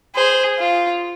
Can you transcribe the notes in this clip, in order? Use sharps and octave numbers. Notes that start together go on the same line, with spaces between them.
G#4 C5
F4